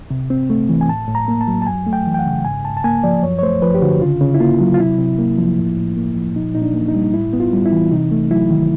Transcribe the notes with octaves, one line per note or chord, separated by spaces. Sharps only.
C3
C4
A3
E3
G#5
A2 A5
A2
A#5
A#3
A5
F#3
A5
F#2 G#5
A3
G5
E3
G5
F#5
C#3
G#2 G#5
G#2 A5
A5
A#3 G#5
F3 D5
F#2 C#5
C#5
A3 C5
F3 B4
G4
D3 F#4
C#3 F4
C#3
E4
A#3 F4
F#3
F4
C3 E4
C3
A#3
F3
A2
A2
A#3
F3
A#2 D#4
A#2 D#4
D4
A#3
D#4
G3
D#4
A2 E4
B3
F4
G3
E4
E3
C3 D#4
A3
F#3 E4
D#3